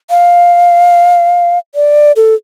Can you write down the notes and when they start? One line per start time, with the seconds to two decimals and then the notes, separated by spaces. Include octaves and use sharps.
0.10 F5
1.75 D5
2.16 A4